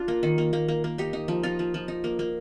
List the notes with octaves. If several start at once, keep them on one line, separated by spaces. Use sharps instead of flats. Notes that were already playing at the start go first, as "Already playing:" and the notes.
Already playing: D4 F4
A#3
D#3
A#3
A#3
A#3
A#3
D#4 G4
D#4
F3
D#4 F4
F3
F3
D#4
A#3
A#3